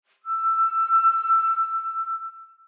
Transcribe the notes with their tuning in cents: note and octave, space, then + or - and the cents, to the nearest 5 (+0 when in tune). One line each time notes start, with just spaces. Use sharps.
E6 +20